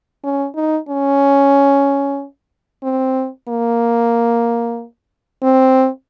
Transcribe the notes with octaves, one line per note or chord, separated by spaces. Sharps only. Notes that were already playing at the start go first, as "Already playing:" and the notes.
C#4
D#4
C#4
C4
A#3
C4